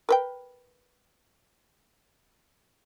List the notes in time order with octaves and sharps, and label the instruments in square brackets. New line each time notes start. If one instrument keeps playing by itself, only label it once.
[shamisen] A#4 B4 G5